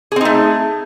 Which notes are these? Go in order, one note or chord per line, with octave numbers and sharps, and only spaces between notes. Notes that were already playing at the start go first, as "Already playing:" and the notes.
A3 C4 D#4 G#4